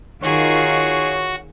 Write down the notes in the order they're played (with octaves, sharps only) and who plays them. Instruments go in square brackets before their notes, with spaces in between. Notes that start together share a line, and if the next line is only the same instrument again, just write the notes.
[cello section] D#3 F4 A#4 [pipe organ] F#4 [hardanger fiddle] G#4 [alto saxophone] C#5